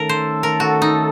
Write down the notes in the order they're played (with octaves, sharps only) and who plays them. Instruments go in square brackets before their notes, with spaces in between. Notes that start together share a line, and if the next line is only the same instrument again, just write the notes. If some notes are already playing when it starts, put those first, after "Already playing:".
Already playing: [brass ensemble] D#3 A3 C#4 A4 [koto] A#4
[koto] C5
A#4
F#4
D#4